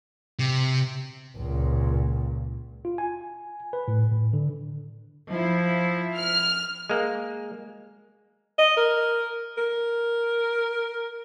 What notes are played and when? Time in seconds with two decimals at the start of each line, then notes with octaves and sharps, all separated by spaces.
0.39 C3
1.37 C#2 A#2
2.85 F4
2.98 G#5
3.73 B4
3.88 A2
4.11 A2
4.33 D3
5.31 F3 E4
6.18 F6
6.90 G#3 A#3
8.58 D#5
8.77 A#4
9.58 A#4